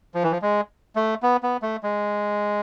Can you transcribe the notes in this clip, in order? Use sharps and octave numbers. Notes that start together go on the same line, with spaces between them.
F3
E3
F3
G#3
A3
B3
B3
A3
G#3